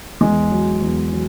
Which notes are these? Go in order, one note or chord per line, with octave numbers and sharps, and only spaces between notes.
E2 G#3
F#3
E2
F#3